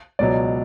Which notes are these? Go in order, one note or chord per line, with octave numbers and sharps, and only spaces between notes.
C#2 B2 F#3 D5